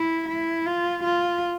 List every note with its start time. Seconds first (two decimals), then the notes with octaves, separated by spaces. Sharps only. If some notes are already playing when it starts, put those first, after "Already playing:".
Already playing: E4
0.29 E4
0.66 F4
1.04 F4